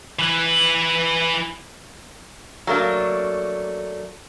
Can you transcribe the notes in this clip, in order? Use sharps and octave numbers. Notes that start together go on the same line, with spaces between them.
E3 B4
F#3 A3 A#3 D4